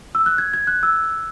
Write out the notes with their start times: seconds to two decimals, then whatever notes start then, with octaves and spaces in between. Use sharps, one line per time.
0.15 E6
0.26 F#6
0.38 G#6
0.53 G#6
0.67 F#6
0.83 E6